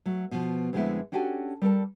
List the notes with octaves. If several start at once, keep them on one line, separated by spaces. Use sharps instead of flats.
F#3 A3
B2 F3
F2 D3 G#3 A3 B3 E4
C#4 D4 F#4 G4 A4 G#5
G3 A4 A#4 A5